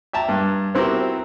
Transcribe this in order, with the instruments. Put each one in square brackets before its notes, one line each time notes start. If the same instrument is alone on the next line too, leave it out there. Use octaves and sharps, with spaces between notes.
[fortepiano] E5 G5 A5 A#5
G2
B3 C4 E4 F#4 G4 A#4